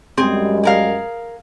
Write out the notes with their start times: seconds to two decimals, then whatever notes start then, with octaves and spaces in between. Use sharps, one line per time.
0.17 F#2 G3 G#3 C4 G#4
0.64 G#4 A#4 F5